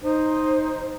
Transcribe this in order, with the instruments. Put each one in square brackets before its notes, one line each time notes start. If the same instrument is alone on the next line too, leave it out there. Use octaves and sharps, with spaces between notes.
[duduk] D#4 [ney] C5